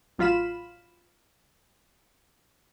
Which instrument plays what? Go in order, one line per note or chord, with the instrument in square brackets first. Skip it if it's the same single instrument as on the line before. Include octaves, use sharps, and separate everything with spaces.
[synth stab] A1 F#3 F4 F5 B5 E7